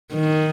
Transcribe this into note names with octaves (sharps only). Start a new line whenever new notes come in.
D#3